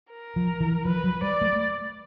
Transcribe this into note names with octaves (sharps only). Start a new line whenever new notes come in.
A#4
F3
E3
F3 B4
F#3
G3 D5
A3